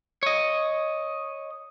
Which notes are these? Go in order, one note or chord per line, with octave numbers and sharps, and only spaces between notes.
C#5 D#5